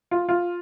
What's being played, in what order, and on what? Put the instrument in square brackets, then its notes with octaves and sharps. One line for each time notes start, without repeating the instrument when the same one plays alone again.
[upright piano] F4
F4